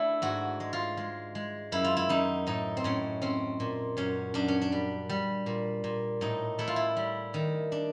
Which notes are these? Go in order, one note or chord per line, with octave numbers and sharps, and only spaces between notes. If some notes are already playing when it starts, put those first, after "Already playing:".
Already playing: A3 D4 E4
G#2 F#4
G#3
F4
G#3
G#3
F#2 E4
F4
E4
F#2 D#4
A2 D#4
C4
A2 C#4
C4 C#4
A#2
F#2 C#4
F#2 D4
C#4
D4
G3
G3
A#2
A#2
A2 D#4
A3 E4
F4
E4
G3
D#3
D4